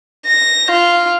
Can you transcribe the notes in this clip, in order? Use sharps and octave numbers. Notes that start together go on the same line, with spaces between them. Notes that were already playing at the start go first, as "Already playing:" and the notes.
A#6
F4